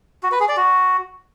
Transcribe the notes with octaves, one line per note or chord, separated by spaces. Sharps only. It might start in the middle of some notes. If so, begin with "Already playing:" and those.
F#4
B4
G#4
D5
F#4